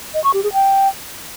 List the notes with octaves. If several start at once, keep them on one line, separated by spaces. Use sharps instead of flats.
D#5
C#6
G4
G#4
G5